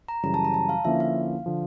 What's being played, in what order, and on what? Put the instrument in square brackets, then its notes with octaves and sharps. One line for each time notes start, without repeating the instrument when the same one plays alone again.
[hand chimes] A#5
[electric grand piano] F#2 C#3 E3 G3 [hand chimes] A#5
[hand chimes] A5
A#5
A5
F5
[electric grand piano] D3 F3 A#3 C#4 E4 [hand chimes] E5
[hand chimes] F5
[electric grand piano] D3 F3